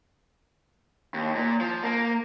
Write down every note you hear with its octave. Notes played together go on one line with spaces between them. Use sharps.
D#2
A#2
F3
A#3